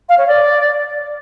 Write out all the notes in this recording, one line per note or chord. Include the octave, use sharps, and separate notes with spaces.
F5
C#5
D5